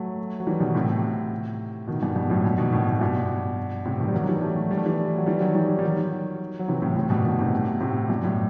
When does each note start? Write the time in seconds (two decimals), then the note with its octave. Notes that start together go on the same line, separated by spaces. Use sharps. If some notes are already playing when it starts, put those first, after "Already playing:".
Already playing: F#3 A3
0.40 F#3
0.47 E3 G3
0.60 B2 D#3
0.75 A2 C3
1.87 B2 D#3
2.02 G2 B2
2.16 G2
2.30 F#2 A2
2.44 G2 B2
2.58 B2 D#3
2.72 A2 C3
2.89 A2
3.01 G2 B2
3.85 A2 C3
4.00 B2 D#3
4.08 G3
4.14 D#3 F#3
4.28 E3 G3
4.42 F#3 A3
4.71 G3
4.78 A3
4.86 E3 G3
5.17 F#3
5.26 E3 G3
5.41 D#3 F#3
5.55 E3 G3
5.79 G3
5.83 D#3 F#3
6.59 F#3
6.68 C3 E3
6.82 A2 C3
6.96 A2 C3
7.10 G2 B2
7.24 B2 D#3
7.39 A2 C3
7.81 A2 C3
8.09 G2 B2
8.23 F#2 A2